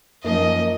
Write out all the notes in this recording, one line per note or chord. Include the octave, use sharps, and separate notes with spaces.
F#2 F3 A#3 D#4 A#4 D#5